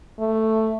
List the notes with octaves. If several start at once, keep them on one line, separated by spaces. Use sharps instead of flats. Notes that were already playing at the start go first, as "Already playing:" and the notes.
A3